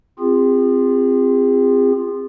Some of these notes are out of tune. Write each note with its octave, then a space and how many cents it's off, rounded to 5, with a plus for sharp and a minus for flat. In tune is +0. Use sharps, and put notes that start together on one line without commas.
C4 +0 F4 +0 G#4 -35